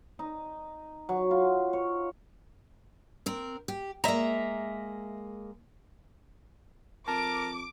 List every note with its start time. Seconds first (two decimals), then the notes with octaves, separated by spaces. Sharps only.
0.19 D#4
1.09 F#3
1.31 F4
1.73 C#5
3.26 C4 A#4
3.68 G4
4.04 G#3 A#3 E5 A#5
7.08 F2 A#4 A5 D6